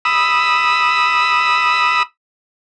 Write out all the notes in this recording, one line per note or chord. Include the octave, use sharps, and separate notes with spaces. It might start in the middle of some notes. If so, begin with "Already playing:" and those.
B5 D#6 E6